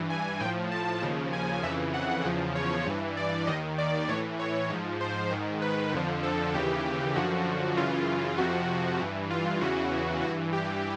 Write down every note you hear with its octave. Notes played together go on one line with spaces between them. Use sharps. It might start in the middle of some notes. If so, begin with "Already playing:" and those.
Already playing: G2 E3
G#5
A2 F3 G5
A5
D#2 C#3 F3
G#5
F2 C#3 E3 E5
F#5
E2 C#3 F3
C#5
G2 E3
D5
D#2 D#3 D#5
D5
A2 E3 C#5
C#5
G#2 F3
C5
G#2 D#3
B4
F2 D3 F3
A4
D#2 C#3 E3 G4
F#2 D3 F3 F#4
F#2 C#3 E3 F4
F2 C3 F3 F#4
G2 E3
F4
E2 C#3 E3 F#4
G2 E3 F#4
G4